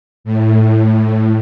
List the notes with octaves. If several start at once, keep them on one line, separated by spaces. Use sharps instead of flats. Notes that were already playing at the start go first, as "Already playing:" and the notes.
A2